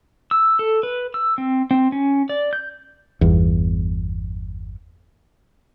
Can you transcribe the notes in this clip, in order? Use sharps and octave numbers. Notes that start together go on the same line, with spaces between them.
E6
A4
B4
E6
C4
C4
C#4
D5
G6
G1 E2